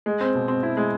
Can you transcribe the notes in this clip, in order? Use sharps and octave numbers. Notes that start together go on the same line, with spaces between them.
G#3
C4
B2
C4
E4
G#3